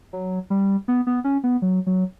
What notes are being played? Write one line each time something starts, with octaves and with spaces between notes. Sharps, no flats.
F#3
G3
B3
B3
C#4
B3
F#3
F#3